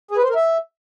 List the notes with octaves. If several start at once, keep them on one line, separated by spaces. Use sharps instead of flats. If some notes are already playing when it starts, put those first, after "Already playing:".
G#4
B4
C5
A#4
E5